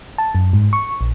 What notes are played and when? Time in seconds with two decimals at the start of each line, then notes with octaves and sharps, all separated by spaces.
0.18 A5
0.35 F#2
0.53 G#2
0.73 C#6
1.01 A#1